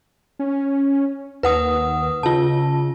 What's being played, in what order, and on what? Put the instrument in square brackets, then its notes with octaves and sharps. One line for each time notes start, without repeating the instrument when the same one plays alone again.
[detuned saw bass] C#4
[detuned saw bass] D#2 [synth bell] B4 F#5 D#6
[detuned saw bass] C#3 [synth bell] F4 A5